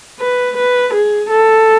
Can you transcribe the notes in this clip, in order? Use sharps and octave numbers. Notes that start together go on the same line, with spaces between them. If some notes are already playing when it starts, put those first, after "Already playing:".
B4
B4
G#4
A4